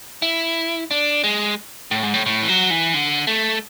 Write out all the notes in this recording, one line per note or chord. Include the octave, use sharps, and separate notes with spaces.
E4
D4
G#3
A2
G#2
A2
A2
E3
F#3
E3
D3
A3